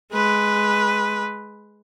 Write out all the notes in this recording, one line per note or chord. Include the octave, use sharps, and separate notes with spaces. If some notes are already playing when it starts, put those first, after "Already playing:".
G#3 B4